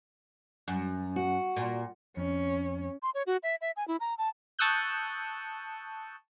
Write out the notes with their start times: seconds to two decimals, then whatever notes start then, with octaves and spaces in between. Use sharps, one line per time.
0.68 F#2
1.16 F#4
1.56 A#2
2.17 F2 C#4
3.02 C6
3.14 C#5
3.27 F#4
3.43 E5
3.61 E5
3.77 G#5
3.88 E4
4.00 A#5
4.18 A5
4.59 A5 C#6 D#6 E6 F#6 G6